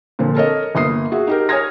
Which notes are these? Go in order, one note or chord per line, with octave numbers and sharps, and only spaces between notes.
A#2 D3 F3 C4
A4 A#4 C#5 D#5
G1 A#3 D#6 C7
F#4 G#4 E5 F#5
D#4 G4 A#4
C#5 G#5 D#6 F6 G#6 A#6